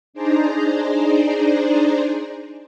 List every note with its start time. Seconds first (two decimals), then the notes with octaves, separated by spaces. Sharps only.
0.13 D4 D#4 G#4 C5 D5 A#5